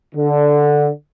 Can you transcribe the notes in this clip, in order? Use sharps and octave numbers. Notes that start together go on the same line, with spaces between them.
D3